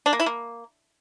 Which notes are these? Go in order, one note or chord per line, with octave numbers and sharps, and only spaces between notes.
D4
A#3
E4
A#3